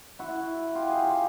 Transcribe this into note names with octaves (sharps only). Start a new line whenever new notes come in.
E4 F#4
F4 G4
F#4 G#4
F4 G4